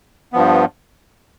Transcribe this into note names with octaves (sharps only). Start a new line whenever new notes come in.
G2 F3 B3